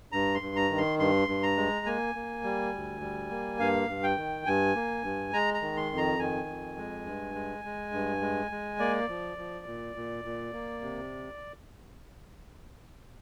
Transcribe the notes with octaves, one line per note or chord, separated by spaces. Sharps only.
G2 A#5
C6
G2
A#5
D#3
C6
G2 C6
G2
A#5
G#3
A#3 G#5
A#3
G3
D2
G3
A#3
G2 F5
G2
G5
D#3
G2 G#5
A#3
G2
G#3 A#5
A#5
D#3
C6
F2
A#5
D#3 G#5
F2
G#3
G2
G#3
G#3
G2
G#3
G#3
A#3 D5
F3
F3
A#2
A#2
A#2
A#3
C3